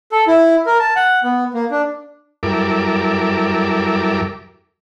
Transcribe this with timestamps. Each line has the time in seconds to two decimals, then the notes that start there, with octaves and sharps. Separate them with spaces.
0.12 A4
0.28 E4
0.66 A#4
0.79 A5
0.96 F#5
1.23 B3
1.54 A#3
1.71 D4
2.43 F#2 G3 E4 A4 A#4 D6